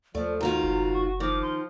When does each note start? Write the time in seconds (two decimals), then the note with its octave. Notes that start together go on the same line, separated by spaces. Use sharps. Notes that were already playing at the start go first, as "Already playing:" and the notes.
0.15 D#2 F3 A3 D5
0.41 G#2 D#3 F4 F#4 A#5
0.64 F#1
0.93 C#6
1.20 D#3 F3 D6
1.42 C6